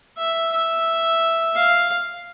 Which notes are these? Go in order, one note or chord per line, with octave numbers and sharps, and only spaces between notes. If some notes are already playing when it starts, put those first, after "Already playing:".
E5
E5
F5